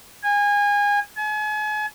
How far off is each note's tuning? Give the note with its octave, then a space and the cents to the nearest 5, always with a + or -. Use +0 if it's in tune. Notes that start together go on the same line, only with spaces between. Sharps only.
G#5 -25
G#5 +40